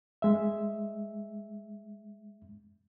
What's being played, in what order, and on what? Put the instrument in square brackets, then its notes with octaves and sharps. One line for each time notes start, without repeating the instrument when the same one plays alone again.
[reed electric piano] G#3 E5